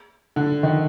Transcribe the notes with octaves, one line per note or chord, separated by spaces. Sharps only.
D3
D#3